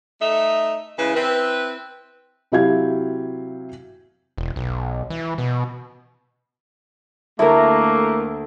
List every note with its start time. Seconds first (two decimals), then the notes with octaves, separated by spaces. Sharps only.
0.21 A3 D#4 A4 E5
0.98 C#3 E3 G#3 E4 B4
1.15 C4 E4 B4
2.52 C3 F#3 E4 G4 F5 G#6
4.38 E1
4.56 B1
5.10 E3
5.38 B2
7.39 D2 A3 A#3 E4 A#4